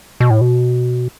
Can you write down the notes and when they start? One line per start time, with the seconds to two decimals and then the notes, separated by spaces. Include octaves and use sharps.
0.20 B2
0.30 A2
0.41 B2